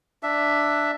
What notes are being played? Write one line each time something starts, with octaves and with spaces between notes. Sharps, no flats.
D4 E5